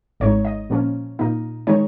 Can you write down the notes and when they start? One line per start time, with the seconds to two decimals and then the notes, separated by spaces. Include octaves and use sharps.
0.20 G#1 G#2 G#3 D#4 C#5
0.45 D#5
0.70 A#2 F3 A#3 C#4
1.19 A#2 A#3 D#4
1.67 D#3 G#3 D#4 C#5